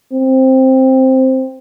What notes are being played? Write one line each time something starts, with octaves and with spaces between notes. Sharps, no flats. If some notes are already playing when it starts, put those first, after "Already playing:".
C4